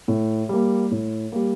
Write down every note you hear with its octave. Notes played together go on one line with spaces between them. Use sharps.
A2
G3 A#3
A2
G3 A#3